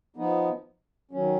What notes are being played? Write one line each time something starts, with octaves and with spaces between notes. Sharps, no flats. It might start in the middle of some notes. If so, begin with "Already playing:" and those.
F3 B3 D#4
D#3 F#3 C#4